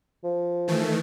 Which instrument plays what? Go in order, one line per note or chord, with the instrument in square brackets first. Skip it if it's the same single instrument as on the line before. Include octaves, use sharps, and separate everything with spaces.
[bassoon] F3
[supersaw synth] D#3 E3 A3